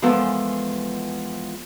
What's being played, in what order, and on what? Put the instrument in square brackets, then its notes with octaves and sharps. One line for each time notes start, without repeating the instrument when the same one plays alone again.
[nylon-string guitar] E2 F3 G#3 B3 A4 A#4